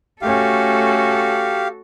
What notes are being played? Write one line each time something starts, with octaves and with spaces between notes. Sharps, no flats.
A3 C#4 F#4 G4 A4 F5